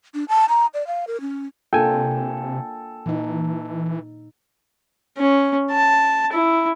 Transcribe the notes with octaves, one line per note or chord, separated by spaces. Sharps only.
D4
A5
A#5
D5
F5
A#4
C#4
C3 A#3 D4 F4 A4 G5 G#5
A#2 E3 D#4
C#4
A5
E4